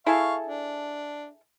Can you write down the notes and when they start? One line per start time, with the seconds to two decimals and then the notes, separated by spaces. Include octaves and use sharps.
0.06 E4 G#4 A4 F5 C#6
0.46 D4